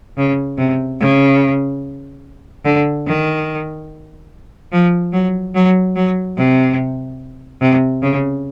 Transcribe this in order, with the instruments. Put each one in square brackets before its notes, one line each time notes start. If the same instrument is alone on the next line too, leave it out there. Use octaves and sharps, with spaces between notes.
[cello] C#3
C3
C#3
D3
D#3
F3
F#3
F#3
F#3
C3
C3
C#3